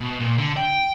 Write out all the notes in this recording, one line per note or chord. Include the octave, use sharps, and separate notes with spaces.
B2
A#2
D3
G5